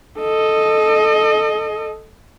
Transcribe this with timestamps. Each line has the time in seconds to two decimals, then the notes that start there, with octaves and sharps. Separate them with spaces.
0.20 A4 D#5